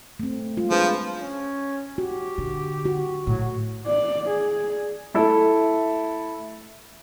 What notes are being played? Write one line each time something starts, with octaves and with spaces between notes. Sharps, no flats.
A3 C4
G3 G#3 F4
F3 D4 G#4 B4
C#4
F#4 G4
D3
F#4
A2 F#3
D5
G#4
A3 E4 A4